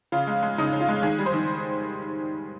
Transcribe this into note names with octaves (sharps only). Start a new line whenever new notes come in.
C#3 F4
G#3
G#3
C#3 D#4
C#3
F4
G#3
D#3 G#4
G3
C5
D#3